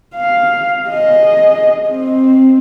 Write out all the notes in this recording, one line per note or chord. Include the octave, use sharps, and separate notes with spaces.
F5
G#4 D#5
C4